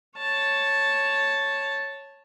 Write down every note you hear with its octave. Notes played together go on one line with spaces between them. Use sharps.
C#5 A5